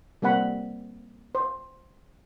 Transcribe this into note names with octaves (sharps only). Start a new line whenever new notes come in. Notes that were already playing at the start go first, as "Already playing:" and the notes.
G3 A#3 C4 F#5 B5
C5